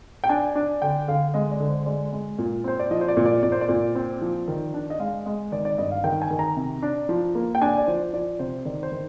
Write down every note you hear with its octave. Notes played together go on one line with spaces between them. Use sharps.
G5
D4 G#5
D4
D3 G5
D3 F5
G#3 D#5
D5
D3
C5
G#3 D5
G#3
A#2
C4 C5
D5
F3 D#5
C5
D5
A#2
D5
A#2 D5
C5
D5
A#2
C4
F3
D#3
D4
D#5
G#3 F5
G#3 D#5
D#3 D5
D5
G2 D#5
F5
D#3 G5
G#5
D#3
A#5
C3
D4
F3
A#3
G5
D4 G#5
D5
F3 C5
F3 D5
C3 C5
D#3 D5
C5
D#3